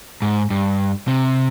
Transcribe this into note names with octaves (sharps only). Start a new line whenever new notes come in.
G#2
G2
C3